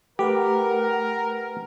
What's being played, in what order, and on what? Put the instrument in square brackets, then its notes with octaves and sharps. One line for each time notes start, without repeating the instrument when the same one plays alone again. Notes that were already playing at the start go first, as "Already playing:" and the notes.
[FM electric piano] A3 B4 [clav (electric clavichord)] G4 [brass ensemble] A#4 [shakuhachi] F#5